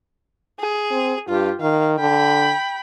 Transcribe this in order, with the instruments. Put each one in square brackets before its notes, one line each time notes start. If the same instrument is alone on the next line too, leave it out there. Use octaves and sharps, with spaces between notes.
[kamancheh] G#4
[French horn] C4
[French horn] G2 [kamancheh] F4 G4
[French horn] D#3 [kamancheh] F5
[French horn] D3 [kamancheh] G5 B5